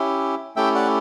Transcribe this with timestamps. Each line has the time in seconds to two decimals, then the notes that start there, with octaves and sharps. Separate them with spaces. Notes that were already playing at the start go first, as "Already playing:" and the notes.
Already playing: C#4 E4 G4
0.56 A3 C#4 E4 G4 E5 G5
0.75 D5 F#5